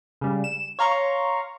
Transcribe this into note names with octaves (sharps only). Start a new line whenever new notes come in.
C#3 G3
E7
C#5 F5 A#5 C6 C#6